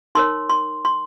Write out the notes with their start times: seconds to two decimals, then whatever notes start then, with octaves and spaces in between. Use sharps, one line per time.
0.15 D#4 A#4 C#5 C6
0.50 C6
0.85 C6